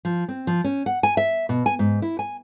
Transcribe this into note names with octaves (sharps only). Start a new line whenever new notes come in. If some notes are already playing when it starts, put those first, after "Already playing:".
F3
C4
F3
C#4
F#5
G#5
E5
B2
G#5
G#2
E4
G#5